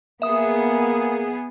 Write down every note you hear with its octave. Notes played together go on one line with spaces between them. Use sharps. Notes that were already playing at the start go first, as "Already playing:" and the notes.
A#3 B3 G#4 E5 D#6